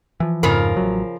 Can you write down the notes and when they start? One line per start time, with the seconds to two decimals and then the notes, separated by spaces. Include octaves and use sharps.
0.20 E3 F3
0.43 F2 G#2 C#3 F3 A#4
0.76 A1 F#3